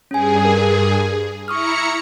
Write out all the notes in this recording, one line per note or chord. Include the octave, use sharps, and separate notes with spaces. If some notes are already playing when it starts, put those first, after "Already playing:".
G2 C#4 G#4 G#5
A#4
E4 A#5 C#6 D#6 F6 C#7